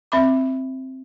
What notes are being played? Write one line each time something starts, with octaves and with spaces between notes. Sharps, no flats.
C4 E5 B5 D6